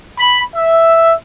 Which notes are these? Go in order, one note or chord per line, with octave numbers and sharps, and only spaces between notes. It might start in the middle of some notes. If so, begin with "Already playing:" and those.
B5
E5